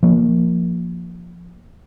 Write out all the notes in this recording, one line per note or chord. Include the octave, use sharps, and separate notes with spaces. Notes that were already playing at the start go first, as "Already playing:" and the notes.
F3 A#3